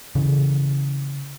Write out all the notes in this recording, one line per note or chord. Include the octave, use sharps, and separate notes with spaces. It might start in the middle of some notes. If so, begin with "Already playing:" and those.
C#3 E3